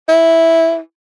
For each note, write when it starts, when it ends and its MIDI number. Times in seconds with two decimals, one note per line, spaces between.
0.08 0.78 64